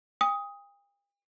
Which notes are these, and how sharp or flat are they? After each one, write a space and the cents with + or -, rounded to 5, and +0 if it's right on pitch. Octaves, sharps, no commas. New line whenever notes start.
G5 +45 D#6 +10